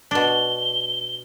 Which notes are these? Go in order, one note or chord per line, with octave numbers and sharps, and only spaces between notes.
B2 D4 G7